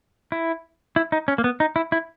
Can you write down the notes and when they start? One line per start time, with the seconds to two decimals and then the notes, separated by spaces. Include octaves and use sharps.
0.32 E4
0.96 E4
1.12 D#4
1.28 C#4
1.38 A#3
1.44 B3
1.60 D#4
1.76 E4
1.92 E4